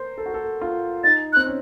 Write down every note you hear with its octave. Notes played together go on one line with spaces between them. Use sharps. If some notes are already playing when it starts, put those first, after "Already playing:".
Already playing: A#4 C5
A4
F#4
A4
F4
D#4 A6
C4 F#6
C#4